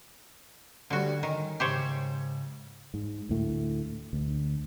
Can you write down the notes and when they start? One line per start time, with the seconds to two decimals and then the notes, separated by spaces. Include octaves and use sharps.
0.90 D2 D3 G3 F#4 C#5
1.23 D#3 C#4
1.60 G#2 C#3 G4 C5 C#5
2.94 G#2
3.29 D2 A2
4.13 D2